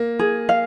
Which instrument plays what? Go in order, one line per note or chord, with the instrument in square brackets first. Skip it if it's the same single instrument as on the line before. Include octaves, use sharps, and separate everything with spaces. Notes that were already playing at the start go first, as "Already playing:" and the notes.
Already playing: [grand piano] A#3
[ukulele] G#4
F5